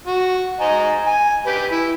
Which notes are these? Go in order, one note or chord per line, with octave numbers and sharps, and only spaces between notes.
F#4
D#5 G#5 A#5
G#5
G4 B4
E4